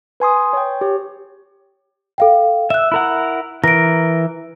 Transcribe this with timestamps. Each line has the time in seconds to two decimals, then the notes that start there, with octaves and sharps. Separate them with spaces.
0.20 B4 G#5 C6 D#6
0.53 C#5 G5
0.81 G4 C#5
2.18 A4 F5 G5
2.70 E5 E6 F#6
2.92 E4 A#4 F#5
3.64 E3 A#4 A#6 D7